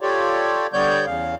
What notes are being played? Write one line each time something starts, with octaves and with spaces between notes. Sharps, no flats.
F4 G4 A4 C#5 D5
D3 G3 B3 C#5 D5 G6
E2 C#3 F5